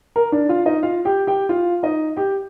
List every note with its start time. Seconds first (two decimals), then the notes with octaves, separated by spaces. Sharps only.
0.16 A#4
0.32 D4 D5
0.49 F4 F5
0.66 D#4 D#5
0.83 F4 F5
1.05 G4 G5
1.27 G4 G5
1.49 F4 F5
1.83 D#4 D#5
2.17 G4 G5